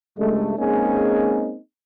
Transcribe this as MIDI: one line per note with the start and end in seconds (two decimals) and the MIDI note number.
0.18 0.55 37
0.18 0.55 43
0.18 0.55 56
0.18 0.55 57
0.57 1.58 56
0.57 1.58 58
0.57 1.58 60
0.57 1.58 61
0.57 1.58 63
0.57 1.58 68